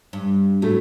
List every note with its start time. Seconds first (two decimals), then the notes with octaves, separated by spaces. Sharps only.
0.13 G2
0.62 A2 F#3 A3